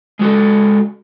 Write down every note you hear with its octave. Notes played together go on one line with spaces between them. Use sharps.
G#3 F#4 A4